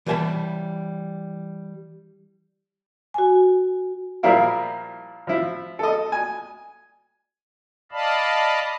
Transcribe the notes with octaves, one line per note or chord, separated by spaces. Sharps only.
E3 G3 B4 G#5 A5 B5
F#4 G#5
A#2 F3 G3 E4 F4 A#4
F3 E4
A4 D#5
G#5
D5 D#5 F5 A5 B5